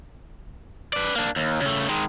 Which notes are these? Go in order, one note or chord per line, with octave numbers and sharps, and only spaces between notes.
B4 D5
A#3 D4
D#2
C#3 A3
D#3 G#3